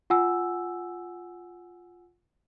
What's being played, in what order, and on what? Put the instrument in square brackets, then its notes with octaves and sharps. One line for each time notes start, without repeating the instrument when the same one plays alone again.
[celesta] F4 F#5 G#5 E6